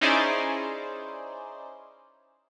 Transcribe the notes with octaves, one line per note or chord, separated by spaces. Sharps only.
C#4 D#4 E4 G#4 C5 D5